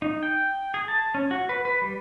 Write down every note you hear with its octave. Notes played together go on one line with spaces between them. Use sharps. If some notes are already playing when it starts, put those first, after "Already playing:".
D#4
G5
G#4
A5
C#4
F#4
B4
B4
G3